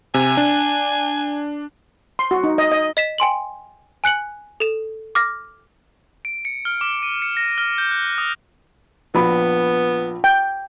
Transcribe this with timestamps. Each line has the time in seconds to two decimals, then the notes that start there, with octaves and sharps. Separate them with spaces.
0.14 C3 G#5
0.37 D4
2.19 C6
2.31 F#4
2.44 D#4
2.58 D#5
2.72 D#5
2.97 D#5 B6 E7
3.18 G5 G#5 C6 F#7
4.04 G#5 F#6 C#7 F#7
4.60 A4 E7
5.15 D6 F6 A#6
6.25 D7
6.45 C#7
6.65 F6
6.81 D6
7.03 D#7
7.22 C#7
7.37 A#6
7.58 F6
7.78 G6
7.91 F#6
8.18 D#6
9.15 A#1 B3 B5
10.24 G5